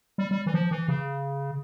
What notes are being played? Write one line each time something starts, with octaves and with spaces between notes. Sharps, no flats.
G3
G3
E3
F3
E3
C#3